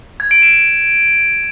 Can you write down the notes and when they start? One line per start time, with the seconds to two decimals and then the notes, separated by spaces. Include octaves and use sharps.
0.20 G#6
0.31 D7
0.42 E7
0.53 E7